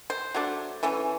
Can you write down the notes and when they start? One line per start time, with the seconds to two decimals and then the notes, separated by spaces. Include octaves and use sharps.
0.10 C5
0.35 F#3 A3 D4
0.83 E3 A3 C#4